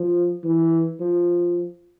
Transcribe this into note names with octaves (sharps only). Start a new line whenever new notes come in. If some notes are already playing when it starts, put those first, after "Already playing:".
Already playing: F3
E3
F3